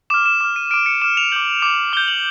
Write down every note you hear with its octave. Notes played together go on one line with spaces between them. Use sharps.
D6 F6 E7
E7
D6 F6
D#7
D6 F6 D7
C#7
D6 F6 E7
F7
D6 G6 F#7
D6 G6
D6 G6 G7
F#7